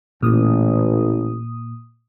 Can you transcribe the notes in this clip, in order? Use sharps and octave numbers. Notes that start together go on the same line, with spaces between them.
A1 A#2 D#6